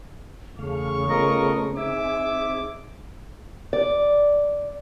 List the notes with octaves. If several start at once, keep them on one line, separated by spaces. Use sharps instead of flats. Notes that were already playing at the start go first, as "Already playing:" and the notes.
E2 C#3 A3 F5 C#6
A3 B3 C#4 F4 A#4 D#5
C4 D#4 G#4 E5 D6
D5